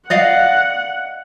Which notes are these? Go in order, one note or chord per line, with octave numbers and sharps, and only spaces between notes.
D5 D#5 F5 F#5